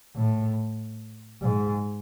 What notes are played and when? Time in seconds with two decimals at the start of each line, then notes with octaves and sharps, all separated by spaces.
0.16 A2
1.41 G#2